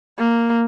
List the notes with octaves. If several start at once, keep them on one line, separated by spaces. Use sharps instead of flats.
A#3